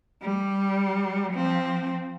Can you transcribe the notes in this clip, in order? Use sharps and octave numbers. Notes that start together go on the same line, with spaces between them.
G3
F3 C4